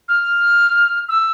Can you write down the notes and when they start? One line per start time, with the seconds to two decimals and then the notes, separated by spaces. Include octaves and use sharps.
0.08 F6
1.09 E6